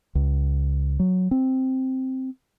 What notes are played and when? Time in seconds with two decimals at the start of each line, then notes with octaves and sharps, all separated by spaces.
0.15 C#2
0.99 F#3
1.31 C4